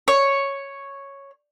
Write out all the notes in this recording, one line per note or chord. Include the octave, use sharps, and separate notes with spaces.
C#5